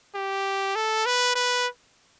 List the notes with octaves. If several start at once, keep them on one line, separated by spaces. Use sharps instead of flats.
G4
A4
B4
B4